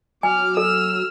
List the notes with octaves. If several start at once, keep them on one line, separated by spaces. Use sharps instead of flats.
F#3 G#5 D6 F6
A4 E6 F6